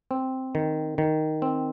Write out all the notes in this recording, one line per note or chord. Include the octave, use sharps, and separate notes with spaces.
C4
D#3
D#3
C4